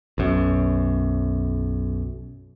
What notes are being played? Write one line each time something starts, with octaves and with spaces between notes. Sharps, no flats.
B1 F#2